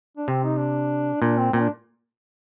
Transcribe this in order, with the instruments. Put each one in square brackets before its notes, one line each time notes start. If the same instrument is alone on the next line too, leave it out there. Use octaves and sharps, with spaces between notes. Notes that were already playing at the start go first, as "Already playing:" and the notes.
[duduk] D4
[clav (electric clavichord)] C3 [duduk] C4
[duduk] D#4
D4
[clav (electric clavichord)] A#2 [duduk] D4
[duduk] C4
[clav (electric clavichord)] A#2 [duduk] C4
[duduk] D4